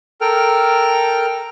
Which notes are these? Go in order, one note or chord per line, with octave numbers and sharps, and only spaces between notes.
A4 A#4 G5 F6